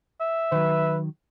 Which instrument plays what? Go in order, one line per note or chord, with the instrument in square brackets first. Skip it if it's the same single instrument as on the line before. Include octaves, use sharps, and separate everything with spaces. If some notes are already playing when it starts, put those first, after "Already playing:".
[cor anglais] E5
[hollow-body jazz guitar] D#3 F#3 [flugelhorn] B4